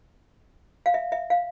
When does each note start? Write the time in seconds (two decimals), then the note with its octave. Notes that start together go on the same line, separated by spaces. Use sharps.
0.86 F5
0.94 E5
1.12 E5
1.30 F5